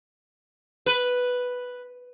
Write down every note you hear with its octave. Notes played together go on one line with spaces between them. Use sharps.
B4